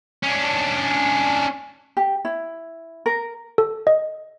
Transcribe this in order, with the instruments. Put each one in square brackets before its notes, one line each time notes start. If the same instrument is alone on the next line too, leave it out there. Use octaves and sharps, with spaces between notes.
[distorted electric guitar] C#4 D4
[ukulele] G4
E4
A#4
[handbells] A4
D#5